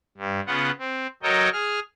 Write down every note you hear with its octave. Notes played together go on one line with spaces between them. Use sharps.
G2
C#3 B3 F4 F#5
C4
F#3 A4 A#4 C#5 D#5 G5
G#4 F6